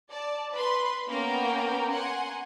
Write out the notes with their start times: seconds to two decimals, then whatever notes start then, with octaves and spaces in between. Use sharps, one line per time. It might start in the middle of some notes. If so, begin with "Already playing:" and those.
0.10 D5 A5
0.52 B4 B5 C6
1.07 A#3 B3 C#4 A#4 G5
1.91 F#5 G#5 C6